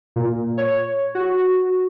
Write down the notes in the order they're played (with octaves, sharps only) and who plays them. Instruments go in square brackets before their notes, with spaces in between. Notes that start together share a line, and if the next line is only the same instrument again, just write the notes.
[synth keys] A#2
C#5
F#4